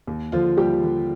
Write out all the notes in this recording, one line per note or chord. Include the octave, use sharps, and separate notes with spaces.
D#2
D3 F3 F4
D#2 G3 G4
D3